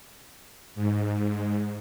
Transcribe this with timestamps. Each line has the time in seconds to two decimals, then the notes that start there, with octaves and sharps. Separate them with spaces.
0.75 G#2